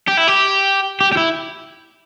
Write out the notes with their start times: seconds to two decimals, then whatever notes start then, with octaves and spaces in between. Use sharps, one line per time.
0.08 G4
0.17 E4
0.28 G4
1.01 G4
1.12 G4
1.17 E4